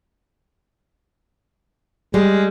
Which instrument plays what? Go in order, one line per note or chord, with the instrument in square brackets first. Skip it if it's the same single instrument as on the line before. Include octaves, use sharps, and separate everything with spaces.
[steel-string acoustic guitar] G3 [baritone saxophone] G#3